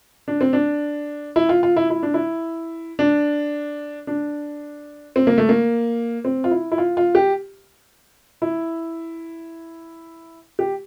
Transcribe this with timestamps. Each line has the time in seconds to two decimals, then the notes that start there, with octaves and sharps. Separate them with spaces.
0.28 D4
0.41 C4
0.53 D4
1.36 E4
1.49 F4
1.63 F4
1.76 E4
1.90 E4
2.03 D4
2.14 E4
2.99 D4
4.07 D4
5.16 C4
5.27 A#3
5.38 A3
5.49 A#3
6.25 C4
6.44 F4
6.51 E4
6.72 E4
6.78 F4
6.97 F4
7.15 G4
8.42 E4
10.59 G4